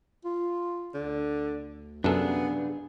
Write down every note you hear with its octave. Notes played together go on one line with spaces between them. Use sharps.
F4
D2 D3
F#2 C3 B3 D4 G#4 A4